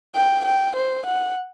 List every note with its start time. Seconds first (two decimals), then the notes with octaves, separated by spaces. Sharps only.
0.15 G5
0.45 G5
0.76 C5
1.06 F#5